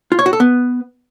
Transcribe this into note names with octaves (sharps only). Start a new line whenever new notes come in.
F4
C#5
F#4
A4
B3